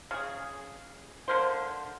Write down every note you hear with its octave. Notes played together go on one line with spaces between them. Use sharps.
C#3 G#4
D3 A#3 C5